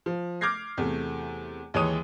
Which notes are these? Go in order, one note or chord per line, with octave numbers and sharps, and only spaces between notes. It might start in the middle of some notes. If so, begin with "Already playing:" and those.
F3
D6 F6 G6 G#6 A#6 C7
E2 C3 A3
D#2 E3 G#3 C#5 D#6 D#7